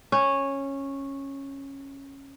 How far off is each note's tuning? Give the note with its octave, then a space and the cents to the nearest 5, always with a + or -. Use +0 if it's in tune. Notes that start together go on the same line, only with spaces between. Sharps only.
C#4 -10